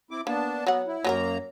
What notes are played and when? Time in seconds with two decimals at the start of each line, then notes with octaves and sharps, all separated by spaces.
0.11 C4 E4 D6
0.27 A#3 B3 D4 A5
0.67 F#3 B3 F#5
0.87 E4
1.04 F#2 F#3 A#3 F4 A#4 A#5